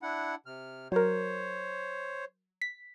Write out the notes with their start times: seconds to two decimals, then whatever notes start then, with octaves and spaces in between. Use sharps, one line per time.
0.03 D4 E4 F#5
0.46 C3 F6
0.92 F#3 A#4 C5 C#5
2.62 B6